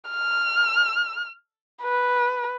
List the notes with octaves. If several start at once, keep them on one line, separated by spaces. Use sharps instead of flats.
F6
B4